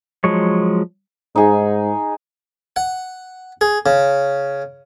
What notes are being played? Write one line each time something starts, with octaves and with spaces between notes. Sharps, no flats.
F3 F#3 G#3 C#5
G#2 D#4 G#4
F#5
G#4
C#3